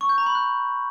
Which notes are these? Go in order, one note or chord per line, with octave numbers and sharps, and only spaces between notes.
C#6
G6
A#5
B5
F#6